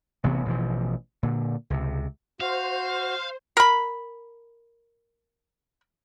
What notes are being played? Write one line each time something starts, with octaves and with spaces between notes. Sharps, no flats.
A1 C3 E3 B3
A1 B2 E3 F3
A#2 D3
C#2 C3
F#4 C5 F5
A#4 B5